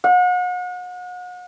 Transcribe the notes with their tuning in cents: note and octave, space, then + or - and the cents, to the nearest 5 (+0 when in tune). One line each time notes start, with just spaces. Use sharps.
F#5 -40